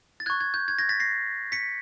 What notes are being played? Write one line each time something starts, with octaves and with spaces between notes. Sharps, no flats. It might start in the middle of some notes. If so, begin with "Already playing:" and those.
A6
C#6 F#6 G#6
G#6
G6
G#6
G#6 A#6
A6 B6
A#6 C7
B6 C#7